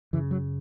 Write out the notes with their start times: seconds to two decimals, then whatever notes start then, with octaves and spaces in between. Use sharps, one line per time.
0.13 F#2 C#3 E3
0.31 F#3